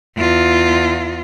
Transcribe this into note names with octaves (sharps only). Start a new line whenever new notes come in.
E2 F4